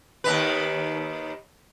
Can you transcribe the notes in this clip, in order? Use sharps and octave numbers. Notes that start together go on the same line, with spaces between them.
D#2 D#3 B4